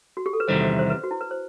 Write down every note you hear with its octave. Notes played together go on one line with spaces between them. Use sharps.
F#4
G4
A4
B4
E2 C3 D#3 G3 C5
C5
C5
B4
F#4
E4
B4
C5